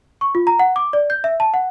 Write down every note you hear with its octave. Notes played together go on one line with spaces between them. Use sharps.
C#6
F4
A#5
F#5
D6
D5
G6
E5
A5
F#5